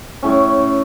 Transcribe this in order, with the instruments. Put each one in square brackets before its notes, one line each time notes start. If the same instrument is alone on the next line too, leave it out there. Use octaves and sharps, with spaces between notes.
[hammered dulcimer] A2 C#4